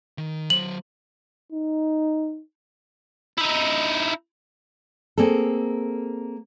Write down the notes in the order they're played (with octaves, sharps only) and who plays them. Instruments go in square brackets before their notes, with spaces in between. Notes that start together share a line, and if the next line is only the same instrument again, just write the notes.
[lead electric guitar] D#3
[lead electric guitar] F#3 C5 [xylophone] F#7
[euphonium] D#4
[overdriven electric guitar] D#4 E4
[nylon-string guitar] A#3 C4 G#4 A4